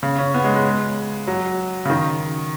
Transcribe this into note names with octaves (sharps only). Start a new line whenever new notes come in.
C#3
C#4
B3
G#3
G#3
F#3
C#3
D#3